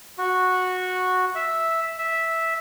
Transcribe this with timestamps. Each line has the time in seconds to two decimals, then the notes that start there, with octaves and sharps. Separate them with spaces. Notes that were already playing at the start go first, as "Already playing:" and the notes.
0.18 F#4
1.35 E5
1.98 E5